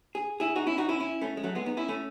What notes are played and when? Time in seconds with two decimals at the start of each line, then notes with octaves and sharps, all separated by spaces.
0.15 G#4
0.40 E4 G#4
0.56 D#4 F#4
0.67 C#4 E4
0.78 D#4 F#4
0.89 C#4 E4
1.00 C#4 E4
1.21 A3 C#4
1.37 G#3
1.43 F#3 A3
1.55 G#3 B3
1.66 B3 D#4
1.77 C#4 E4
1.89 A3 C#4